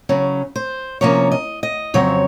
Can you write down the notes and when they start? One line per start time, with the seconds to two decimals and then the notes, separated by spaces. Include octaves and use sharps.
0.09 C#3 F#3 C#4
0.56 C5
1.01 C3 F3 A#3 C#4 C#5
1.32 D#5
1.63 D#5
1.94 F2 C#3 F#3 C4 C#5